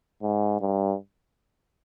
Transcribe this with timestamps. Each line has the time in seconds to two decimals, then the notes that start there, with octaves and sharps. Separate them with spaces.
0.23 G#2
0.61 G2